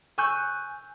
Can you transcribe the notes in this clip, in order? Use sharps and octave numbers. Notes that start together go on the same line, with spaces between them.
G#5 C#6 E6 F#6 G6